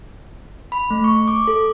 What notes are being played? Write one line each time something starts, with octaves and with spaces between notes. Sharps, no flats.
B5
A3
C#6
D6
A4